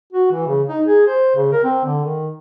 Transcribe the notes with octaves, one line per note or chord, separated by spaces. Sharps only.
F#4
E3
C#3
D#4
G#4
C5
C#3
A#4
C4
D3
D#3